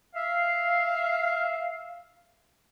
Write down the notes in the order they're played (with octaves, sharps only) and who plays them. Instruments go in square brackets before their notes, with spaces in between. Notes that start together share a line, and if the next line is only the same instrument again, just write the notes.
[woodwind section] E5 F5